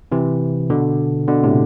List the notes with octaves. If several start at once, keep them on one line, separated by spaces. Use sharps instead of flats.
C3 E3
B2 D3
B2 D3
A2 C3